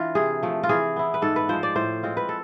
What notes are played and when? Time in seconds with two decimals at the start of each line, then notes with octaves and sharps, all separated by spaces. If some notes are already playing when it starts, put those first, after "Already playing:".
Already playing: E3 D4 F4
0.15 C3 G#4
0.43 F3 A3
0.63 F4
0.69 E3 G#4
0.96 B3 E4
1.14 B4
1.22 G#2 A4
1.36 B4
1.49 F3 G#3 C5
1.63 D5
1.76 A2 C5
2.03 G#3 C4 F4
2.17 B4
2.29 A4